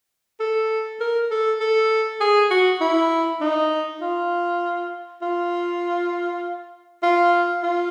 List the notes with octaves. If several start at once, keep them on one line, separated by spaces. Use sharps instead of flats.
A4
A#4
A4
A4
G#4
F#4
E4
D#4
F4
F4
F4
F4